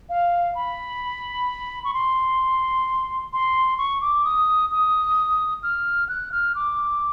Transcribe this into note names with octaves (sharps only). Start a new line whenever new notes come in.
F5
B5
C#6
C6
C6
C#6
D6
D#6
D#6
F6
F#6
F6
D6